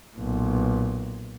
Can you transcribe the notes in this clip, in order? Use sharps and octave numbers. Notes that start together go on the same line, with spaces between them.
B1 A#2